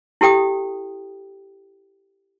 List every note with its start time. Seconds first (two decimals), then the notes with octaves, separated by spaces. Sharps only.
0.21 E4 G4 A4 G5 D#6